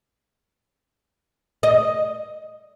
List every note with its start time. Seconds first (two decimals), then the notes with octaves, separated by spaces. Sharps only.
1.63 D#5